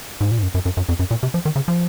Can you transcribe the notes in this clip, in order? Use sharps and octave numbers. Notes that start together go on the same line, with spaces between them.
G#2
A#2
G#2
F#2
F#2
F#2
F#2
F2
F#2
A#2
C3
F3
D#3
C#3
F3